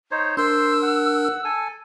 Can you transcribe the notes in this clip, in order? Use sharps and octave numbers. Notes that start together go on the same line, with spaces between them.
D#4 C5 C#5
D4 A#4 C5 C6 E6
F#5
A4 G#5